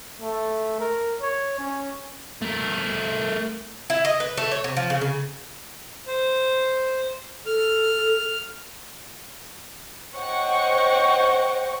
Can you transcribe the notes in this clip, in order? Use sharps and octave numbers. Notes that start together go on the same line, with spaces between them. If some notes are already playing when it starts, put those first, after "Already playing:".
A3
A#4
C#5
C#4
A3 A#4
E4
D#5
B4
A3
C#5
C3
F3
C#3
C#3
C5
A4 F6
C5 C#5 D#5 F#5 G5 C#6